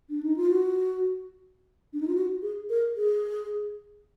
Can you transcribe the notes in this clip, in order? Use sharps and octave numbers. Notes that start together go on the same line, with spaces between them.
D4
D#4
F4
F#4
D4
D#4
F4
F#4
G#4
A#4
G#4